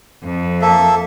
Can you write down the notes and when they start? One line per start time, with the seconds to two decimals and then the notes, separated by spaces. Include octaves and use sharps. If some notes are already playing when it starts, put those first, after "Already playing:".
0.22 F2
0.62 A#3 A4 E5